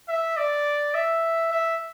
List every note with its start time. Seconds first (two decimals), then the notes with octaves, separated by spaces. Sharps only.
0.09 E5
0.37 D5
0.94 E5
1.52 E5